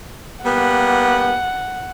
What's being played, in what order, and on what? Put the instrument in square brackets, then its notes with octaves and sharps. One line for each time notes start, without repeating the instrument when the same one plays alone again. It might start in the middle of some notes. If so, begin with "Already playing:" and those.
[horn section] G3 A#3 B3 [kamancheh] F#5